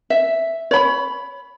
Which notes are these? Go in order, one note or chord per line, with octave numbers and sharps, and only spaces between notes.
E5
C#5 B5